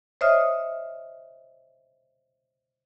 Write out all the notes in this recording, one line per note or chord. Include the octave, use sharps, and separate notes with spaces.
C5 C#5 D#5 E5 D#6 F6